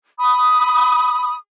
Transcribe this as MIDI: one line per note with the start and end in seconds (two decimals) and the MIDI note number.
0.19 1.33 83
0.19 1.33 87